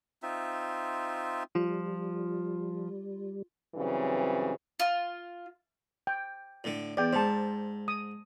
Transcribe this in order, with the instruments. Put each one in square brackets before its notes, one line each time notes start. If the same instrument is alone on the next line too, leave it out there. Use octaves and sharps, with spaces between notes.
[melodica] C4 D#4 F4 E5
[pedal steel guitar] F3 [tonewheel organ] G3 [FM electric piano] F4
[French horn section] G2 C#3 E3 F#3 C4
[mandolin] F4
[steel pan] G5
[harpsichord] A2 D3
[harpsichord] E2 [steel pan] D5 G5
[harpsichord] G#2 [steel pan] C5 A5
[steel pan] D#6